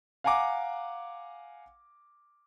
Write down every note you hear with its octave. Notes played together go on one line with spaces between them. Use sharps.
F5 F#5 G#5 A#5 D6